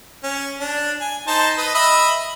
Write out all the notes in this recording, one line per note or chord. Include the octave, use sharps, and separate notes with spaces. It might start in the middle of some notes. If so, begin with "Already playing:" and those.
C#4
D4
G#5
D#4 C5 A5
B4 D#5
D#5 E5 B5